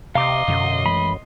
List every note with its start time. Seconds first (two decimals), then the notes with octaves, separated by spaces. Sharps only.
0.15 C3 D#5 F5 A#5 C6 D6
0.48 F#2 B2 D3
0.86 E3 G#3 A3 B5